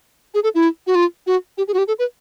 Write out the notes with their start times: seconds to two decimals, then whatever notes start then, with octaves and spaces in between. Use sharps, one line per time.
0.35 G#4
0.44 A4
0.55 E4
0.87 F#4
0.95 F4
1.27 F#4
1.58 G4
1.68 G#4
1.74 F#4
1.78 G4
1.88 A4
1.99 B4